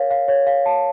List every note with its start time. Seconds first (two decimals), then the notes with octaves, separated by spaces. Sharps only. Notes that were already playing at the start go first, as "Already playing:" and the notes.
Already playing: A#4 C#5 F5
0.10 F5
0.28 C#5
0.47 F5
0.66 A5